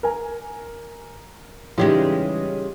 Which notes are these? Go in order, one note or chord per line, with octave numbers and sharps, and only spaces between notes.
A#4 G#5
C#3 E3 G3 G#3 C#4 D#4 F4 G4